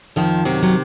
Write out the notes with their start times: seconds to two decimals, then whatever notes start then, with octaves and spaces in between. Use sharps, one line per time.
0.16 F2 D#3 F3
0.45 F#2 C3 F#3
0.63 F#3